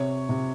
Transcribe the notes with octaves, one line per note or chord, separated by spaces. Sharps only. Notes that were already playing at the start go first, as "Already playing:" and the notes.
Already playing: C3 C#5
C3